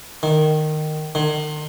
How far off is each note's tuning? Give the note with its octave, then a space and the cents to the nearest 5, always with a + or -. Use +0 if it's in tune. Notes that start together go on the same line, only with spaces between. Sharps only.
D#3 -15
D#3 -45